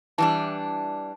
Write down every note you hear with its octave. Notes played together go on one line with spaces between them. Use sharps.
E3 G3 D4 A5